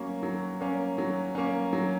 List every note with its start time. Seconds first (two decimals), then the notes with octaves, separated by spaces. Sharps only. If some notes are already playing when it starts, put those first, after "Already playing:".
Already playing: F#3 A#3 C#4
0.23 F#3
0.61 A#3 C#4
0.98 F#3
1.35 A#3 C#4
1.73 F#3